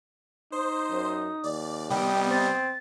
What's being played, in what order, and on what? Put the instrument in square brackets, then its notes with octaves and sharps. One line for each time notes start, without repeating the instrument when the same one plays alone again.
[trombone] D#4 [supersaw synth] C5 [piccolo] D#6
[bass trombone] F#2
[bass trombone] D#2 [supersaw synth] D5
[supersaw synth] C3 B3 D#5 [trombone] G3 [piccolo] G5
[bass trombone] C4 [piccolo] A6